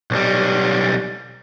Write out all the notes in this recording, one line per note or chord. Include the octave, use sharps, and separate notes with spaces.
B1 G3